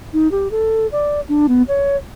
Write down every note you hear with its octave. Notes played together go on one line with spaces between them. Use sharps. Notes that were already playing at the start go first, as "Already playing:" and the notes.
D#4
G4
A4
D5
D4
B3
C#5